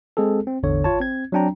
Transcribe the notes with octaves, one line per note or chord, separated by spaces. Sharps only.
G#3 C4 G#4 A4
C4
A1 E2 D3 C#5
G#1 F4 C#5 A5
C4 G#6
F#3 C4 D4 G5 A#5